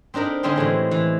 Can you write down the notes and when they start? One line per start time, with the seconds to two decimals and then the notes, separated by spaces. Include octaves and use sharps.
0.14 C4 D4 D#4 A#4 B5
0.43 D3 G3 G#3 C4 C#4 D#4
0.56 A2 E3 G3 G#3
0.91 E3